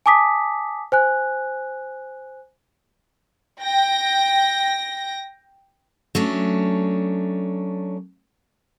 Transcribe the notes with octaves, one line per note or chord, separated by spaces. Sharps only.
G#5 A5 D6 D#6 B6
C5 G#5 F#6
G5 A#6
F#3 A3 C#4 D4